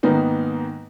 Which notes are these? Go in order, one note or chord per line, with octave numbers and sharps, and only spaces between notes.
G#2 D#3 A#3 B3 D#4